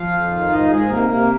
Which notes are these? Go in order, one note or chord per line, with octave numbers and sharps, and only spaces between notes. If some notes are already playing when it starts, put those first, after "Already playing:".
Already playing: F3 F4 F5
F2
D#3
G#2 D#4 D#5
G#2 G#3 G#4
C3 A#3 A#4
C3 A#3 A#4